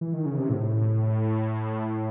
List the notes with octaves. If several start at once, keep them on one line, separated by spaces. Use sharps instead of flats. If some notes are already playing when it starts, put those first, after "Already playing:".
E3
D#3
C#3
C3
A2